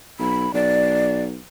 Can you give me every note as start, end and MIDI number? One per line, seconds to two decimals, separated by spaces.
0.19 0.48 35
0.19 0.52 83
0.54 1.38 35
0.54 1.23 74